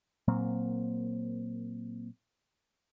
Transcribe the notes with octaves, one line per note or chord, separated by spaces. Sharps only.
A#2 F#3 A#3 C4